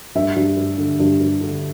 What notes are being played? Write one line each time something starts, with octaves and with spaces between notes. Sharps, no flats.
G2 E5
G2
G2
D3
G2
G2
D3